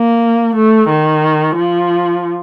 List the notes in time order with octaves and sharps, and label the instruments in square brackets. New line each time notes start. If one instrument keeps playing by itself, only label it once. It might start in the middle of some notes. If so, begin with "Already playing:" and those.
Already playing: [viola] A#3
A3
D#3
F3